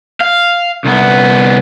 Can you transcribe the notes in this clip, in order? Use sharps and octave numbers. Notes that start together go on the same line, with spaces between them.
F5
C2 B3